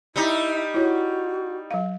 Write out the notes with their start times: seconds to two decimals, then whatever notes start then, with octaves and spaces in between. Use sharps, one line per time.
0.16 G3 D#4 E4
0.74 E4 F#4 C#5
1.71 F#3 F5